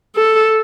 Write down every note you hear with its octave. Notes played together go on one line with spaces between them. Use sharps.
A4